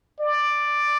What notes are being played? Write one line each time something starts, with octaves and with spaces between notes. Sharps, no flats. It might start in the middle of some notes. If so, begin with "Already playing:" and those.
D5